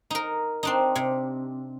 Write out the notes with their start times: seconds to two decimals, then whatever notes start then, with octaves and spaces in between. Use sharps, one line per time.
0.10 D#4 A#4
0.63 C4 D4 D#4
0.95 C3